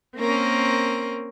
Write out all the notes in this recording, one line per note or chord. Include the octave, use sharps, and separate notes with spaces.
A#3 C4 C#4 A#4